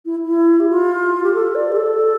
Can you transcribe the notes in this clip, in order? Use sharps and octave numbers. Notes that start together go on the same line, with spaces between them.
E4
E4
G4
F4
G4
A4
D5
G4
A4